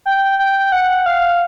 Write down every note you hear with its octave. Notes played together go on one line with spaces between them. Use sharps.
G5
G5
F#5
F5